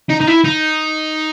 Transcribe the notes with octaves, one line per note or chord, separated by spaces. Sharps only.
D#4
D#4
E4
D#4